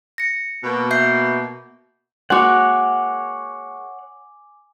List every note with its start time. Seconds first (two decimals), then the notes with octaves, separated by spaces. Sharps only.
0.18 A#6 C#7
0.64 B2 A#3
0.91 E5 G6 C7
2.30 G#3 A#3 F#4 C#5 F#5 G#5 D6